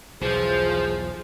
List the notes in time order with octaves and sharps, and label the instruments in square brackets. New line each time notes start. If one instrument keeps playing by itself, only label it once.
[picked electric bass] B1 E2 [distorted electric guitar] F3 [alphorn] G#4 [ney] C5